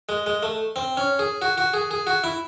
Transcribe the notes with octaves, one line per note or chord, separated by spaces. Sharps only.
G#3
G#3
A3
C4
C#4
G#4
F#4
F#4
G#4
G#4
F#4
E4